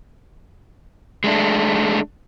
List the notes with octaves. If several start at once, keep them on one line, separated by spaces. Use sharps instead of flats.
G#3 A3 D4